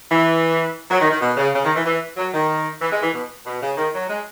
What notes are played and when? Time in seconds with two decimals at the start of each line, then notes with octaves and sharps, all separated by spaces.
0.10 E3
0.90 F#3
1.00 D#3
1.11 D#3
1.21 B2
1.37 C#3
1.54 C#3
1.64 D#3
1.75 E3
1.85 E3
2.17 F#3
2.33 D#3
2.82 E3
2.92 G#3
3.02 E3
3.13 B2
3.45 B2
3.61 C#3
3.77 D#3
3.94 F#3
4.08 G#3